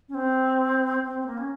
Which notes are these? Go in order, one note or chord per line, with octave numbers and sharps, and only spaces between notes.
C#4
C4
C4
C4
A#3
C#4